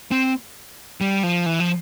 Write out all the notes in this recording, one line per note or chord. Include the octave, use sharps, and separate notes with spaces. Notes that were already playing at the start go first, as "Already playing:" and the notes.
C4
G3
F3
E3
F3